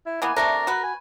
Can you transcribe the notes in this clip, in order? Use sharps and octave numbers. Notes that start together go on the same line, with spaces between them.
E4
E3 A#3 B3 G#5
C3 A3 D4 A#4
F#4 B4
G#5